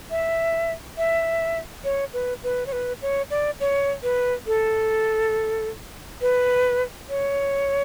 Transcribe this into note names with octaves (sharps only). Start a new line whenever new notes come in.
E5
E5
C#5
B4
B4
C#5
B4
C#5
D5
C#5
B4
A4
B4
C#5